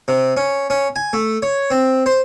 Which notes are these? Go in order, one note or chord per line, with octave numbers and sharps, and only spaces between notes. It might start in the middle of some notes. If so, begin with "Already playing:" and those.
C3
C#4
C#4
G#5
A3
C#5
C4
C5